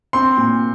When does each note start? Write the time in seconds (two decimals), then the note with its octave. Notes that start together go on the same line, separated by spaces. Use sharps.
0.13 C4 C6
0.37 A#2